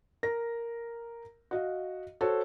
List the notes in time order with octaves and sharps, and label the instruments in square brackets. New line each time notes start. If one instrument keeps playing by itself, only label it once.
[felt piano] A#4 A#6
F#4 D#5 F5
F#4 A4 C5 C#5 A5